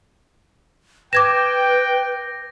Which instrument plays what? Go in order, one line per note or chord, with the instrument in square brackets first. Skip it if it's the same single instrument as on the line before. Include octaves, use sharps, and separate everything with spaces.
[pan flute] B4 [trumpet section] G5 [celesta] D6 G#6 E7 [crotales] A#6